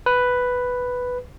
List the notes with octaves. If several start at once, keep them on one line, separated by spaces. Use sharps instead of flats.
B4